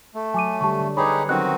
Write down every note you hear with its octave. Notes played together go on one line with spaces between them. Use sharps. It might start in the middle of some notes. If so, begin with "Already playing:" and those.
A3
F#3 G#5 D6 D#7
D3 G3 G4 A5 C#6
D3
D#4 G4 G#4 B4 C#5 B5 D6
D#3 F#3 C4 C#4 F#4 D#5 F#6